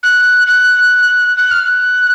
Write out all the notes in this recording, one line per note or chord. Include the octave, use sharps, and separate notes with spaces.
F#6
F#6
F#6
F6
F#6